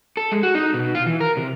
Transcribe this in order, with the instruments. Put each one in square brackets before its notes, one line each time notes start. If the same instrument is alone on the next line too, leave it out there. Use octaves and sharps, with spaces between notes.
[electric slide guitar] A4
G#3
F#4
D#4
B2
F4
E3
A#4
C3